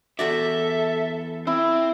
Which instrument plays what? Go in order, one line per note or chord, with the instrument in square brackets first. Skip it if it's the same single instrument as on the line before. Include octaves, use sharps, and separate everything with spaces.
[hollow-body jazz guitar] E2 F#4 D5 [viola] A4 [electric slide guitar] E5
[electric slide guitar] C4 [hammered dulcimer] E4